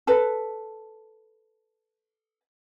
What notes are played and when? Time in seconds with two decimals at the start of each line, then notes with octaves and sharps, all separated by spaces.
0.07 A4 B4